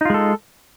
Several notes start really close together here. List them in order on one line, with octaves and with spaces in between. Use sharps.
D#4 F4 G#3 A4